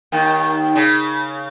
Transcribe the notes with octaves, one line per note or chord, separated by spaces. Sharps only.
D#2 D#3
C#3